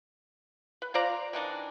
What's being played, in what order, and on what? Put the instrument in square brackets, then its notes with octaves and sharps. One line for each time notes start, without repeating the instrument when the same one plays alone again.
[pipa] B4
F4 C5 D5 A#5
D#3 E3 D4 D#4